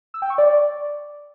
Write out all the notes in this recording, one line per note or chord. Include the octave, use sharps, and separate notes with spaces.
E6
G5
C#6
D5